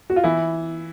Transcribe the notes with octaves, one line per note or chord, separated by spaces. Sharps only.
F#4
F4
E3 E4